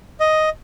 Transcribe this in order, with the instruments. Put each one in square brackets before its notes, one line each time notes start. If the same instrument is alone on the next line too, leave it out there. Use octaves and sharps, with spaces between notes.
[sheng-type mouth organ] D#5